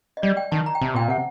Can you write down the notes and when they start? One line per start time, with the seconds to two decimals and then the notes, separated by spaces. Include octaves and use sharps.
0.17 D#5
0.22 G3 D5
0.37 G5
0.52 D#3 A5
0.66 A#5
0.75 G5
0.81 C3 A5
0.94 A#2 G5
1.08 C3 F#5